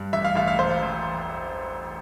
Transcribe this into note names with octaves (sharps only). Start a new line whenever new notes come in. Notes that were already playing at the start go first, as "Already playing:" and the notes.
Already playing: G2
A1 E5
F5
A1 F5
F5
E1 C5
E1